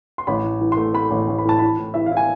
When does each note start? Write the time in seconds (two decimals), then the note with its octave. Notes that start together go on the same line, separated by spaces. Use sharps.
0.18 C6
0.27 A1 B5
0.44 A2
0.61 E3
0.72 C6
0.77 A3
0.94 A3 B5
1.11 A1
1.28 A1
1.38 B5
1.45 A2 A5
1.59 E3 B5
1.79 A2
1.94 E3 E5
2.06 F5
2.11 E4
2.17 G#5